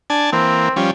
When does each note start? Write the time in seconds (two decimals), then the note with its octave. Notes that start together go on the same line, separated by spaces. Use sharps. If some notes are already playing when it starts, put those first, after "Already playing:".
0.10 D4 G#5 A5
0.32 E3 A#3 C4
0.76 F3 G3 C#4